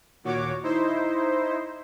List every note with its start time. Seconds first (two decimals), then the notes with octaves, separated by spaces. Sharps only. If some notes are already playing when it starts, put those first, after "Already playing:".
0.24 D#2 A#2 F#4 C#5 D6
0.63 D#4 E4 C5